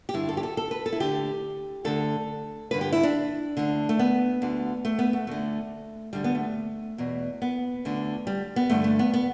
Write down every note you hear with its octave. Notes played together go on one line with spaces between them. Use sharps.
G4
G2 D3 E4
A4
G4
A4
A4
B4
A4
E4
D2 D3 G4
D2 D3 A4
G2 D3 B4
G4
E4
D4
D2 D3
A3
B3
D2 D3
A3
B3
A3
D2 D3 A3
D2 D3 G3
B3
A3
E2 B2
B3
D2 D3
G3
B3
G2 D3 A3
A3
B3
B3